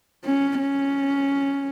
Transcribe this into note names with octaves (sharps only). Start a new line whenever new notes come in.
C#4
C#4